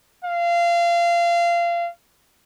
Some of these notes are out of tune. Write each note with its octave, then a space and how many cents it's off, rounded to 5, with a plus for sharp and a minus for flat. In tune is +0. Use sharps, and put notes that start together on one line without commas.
F5 -25